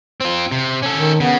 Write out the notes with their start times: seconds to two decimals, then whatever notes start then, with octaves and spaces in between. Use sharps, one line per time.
0.21 C4 F4
0.52 C3
0.83 C#4 A4
0.95 D#3
1.20 C#3 B3